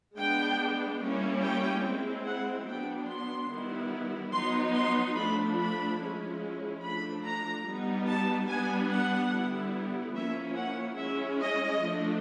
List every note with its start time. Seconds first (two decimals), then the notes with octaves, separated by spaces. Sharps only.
0.17 G#3 B3 D4 G5
1.01 G3 A#3 C#4 E4
1.42 G5
1.84 G#3 C4 E4
2.25 F#5
2.67 F#3 B3 D4 G5
3.08 C6
3.50 D#3 G3 B3 E4
4.33 F#3 B3 D#4 C6
4.74 C6
5.16 F3 A3 D4 B5
5.57 B5
5.99 F3 G#3 C#4 E4
6.82 F3 A3 D4 B5
7.23 A#5
7.65 G3 B3 D#4
8.07 A5
8.48 G3 B3 D4 G#5
8.90 F#5
9.32 D3 G3 B3 E4
10.14 F3 A#3 C#4 E4 E5
10.56 F#5
10.97 G#3 C#4 E4 E5
11.39 D#5
11.80 F3 A3 D4